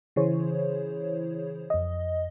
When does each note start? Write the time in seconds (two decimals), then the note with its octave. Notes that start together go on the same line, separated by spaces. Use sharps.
0.16 C#3 E3 E4 G#4 C5 C#5
1.70 F2 D#5